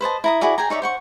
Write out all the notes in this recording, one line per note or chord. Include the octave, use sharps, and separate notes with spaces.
B4 C5 D#5 A5
E4 A#5 D#6
E4 F#4 G#4 D5
G#4 G5 G#5 A#5
D#4 C#5 D5 E5
C5 F#5 C#6